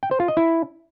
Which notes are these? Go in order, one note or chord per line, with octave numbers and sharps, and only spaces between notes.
G5
C5
F4
D#5
E4